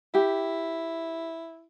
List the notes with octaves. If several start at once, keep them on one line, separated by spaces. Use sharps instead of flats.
E4 G4